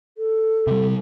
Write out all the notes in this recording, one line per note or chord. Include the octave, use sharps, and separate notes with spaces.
A4
C3 G3